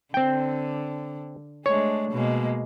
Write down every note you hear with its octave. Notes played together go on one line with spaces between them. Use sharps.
D3 C4 G5
G#3 A3 D4 C#5
B2 G#3 A#3